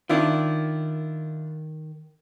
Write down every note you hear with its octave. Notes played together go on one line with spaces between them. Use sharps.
D#3 D4 E4 F4